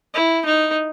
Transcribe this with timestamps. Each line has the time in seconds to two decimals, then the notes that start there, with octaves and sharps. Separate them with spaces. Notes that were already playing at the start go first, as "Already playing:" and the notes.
0.14 E4
0.45 D#4